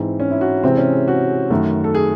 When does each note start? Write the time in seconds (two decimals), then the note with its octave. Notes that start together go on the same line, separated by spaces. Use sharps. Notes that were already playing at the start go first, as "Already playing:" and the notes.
Already playing: G#2 E3 C4
0.20 C#4
0.31 E4
0.41 F#4
0.63 C3 E3 G#3 C4
0.78 C#4
1.08 F#4
1.50 F#2 D#3 A3
1.84 A4
1.95 G#4